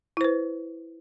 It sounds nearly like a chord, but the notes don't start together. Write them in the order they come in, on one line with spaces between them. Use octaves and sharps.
E4 C5 B4